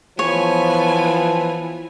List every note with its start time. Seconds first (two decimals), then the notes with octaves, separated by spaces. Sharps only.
0.19 E3 F3 B3 C#5 G#5